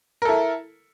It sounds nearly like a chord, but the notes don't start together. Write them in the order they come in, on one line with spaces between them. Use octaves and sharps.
A#4 A4 E4